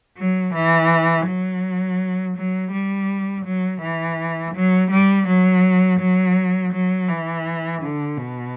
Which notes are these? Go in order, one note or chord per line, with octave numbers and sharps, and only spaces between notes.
F#3
E3
F#3
F#3
G3
F#3
E3
F#3
G3
F#3
F#3
F#3
E3
D3
B2